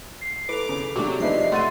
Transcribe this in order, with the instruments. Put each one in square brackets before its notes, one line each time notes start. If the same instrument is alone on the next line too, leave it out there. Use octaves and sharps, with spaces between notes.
[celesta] C7
[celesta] E4 A4 F7 [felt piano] B4 [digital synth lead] D6
[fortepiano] C#3
[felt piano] C3 G#3 [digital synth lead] F#3 [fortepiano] D4 D6
[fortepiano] F3 D#4 B4 [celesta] D5 E5 [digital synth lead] C7
[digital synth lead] A3 [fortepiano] F#5 [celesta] C6 A6 D#7